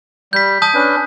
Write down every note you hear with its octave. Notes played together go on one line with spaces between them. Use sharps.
G3 G6 B6
A5 D#6 G6
C#4 D4 B4